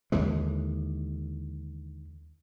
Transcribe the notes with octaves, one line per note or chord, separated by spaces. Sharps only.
D#2 D3 E3 G#3